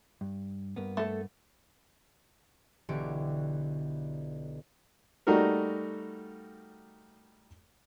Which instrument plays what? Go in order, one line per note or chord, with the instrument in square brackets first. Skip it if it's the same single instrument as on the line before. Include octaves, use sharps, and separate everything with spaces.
[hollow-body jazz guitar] G2
G2 A#3 B3
[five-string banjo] A3 A4
[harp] B1 D3 E3 G4 C#6 D7
[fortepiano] G3 A3 D#4 F#4 A#4